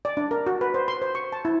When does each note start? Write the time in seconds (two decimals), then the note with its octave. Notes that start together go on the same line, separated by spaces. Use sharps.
0.05 D5
0.17 D4
0.31 A#4
0.46 F#4
0.61 B4
0.74 C5
0.88 C6
1.02 C5
1.15 C#6
1.32 A5
1.45 E4